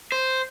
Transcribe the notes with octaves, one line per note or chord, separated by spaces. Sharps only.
C5